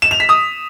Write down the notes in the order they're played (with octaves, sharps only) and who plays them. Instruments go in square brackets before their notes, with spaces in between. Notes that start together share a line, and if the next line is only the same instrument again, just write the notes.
[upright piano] E7
F7
B6
D#6